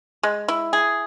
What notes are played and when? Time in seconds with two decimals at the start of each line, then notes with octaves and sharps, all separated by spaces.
0.23 G#3
0.48 E4
0.73 G#4